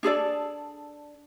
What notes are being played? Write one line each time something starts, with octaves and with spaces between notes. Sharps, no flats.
D4 G#4 A4 D5